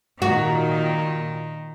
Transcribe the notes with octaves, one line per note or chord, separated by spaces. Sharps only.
A#2 D#3 F#4